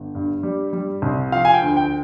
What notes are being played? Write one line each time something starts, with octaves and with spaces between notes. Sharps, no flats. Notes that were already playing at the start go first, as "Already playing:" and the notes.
Already playing: G1
G2
G3
G3
C2
F3 F5
G#5
G5
D2
G5